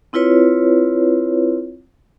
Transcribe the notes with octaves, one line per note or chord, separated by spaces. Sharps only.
C4 E4 F4 B4 C#5